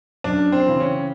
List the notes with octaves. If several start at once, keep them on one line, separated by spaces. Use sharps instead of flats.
F#2 D4
C4
C#3 E3
C#4